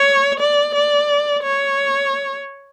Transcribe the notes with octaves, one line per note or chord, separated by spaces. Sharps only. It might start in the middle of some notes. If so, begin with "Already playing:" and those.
Already playing: C#5
D5
D5
C#5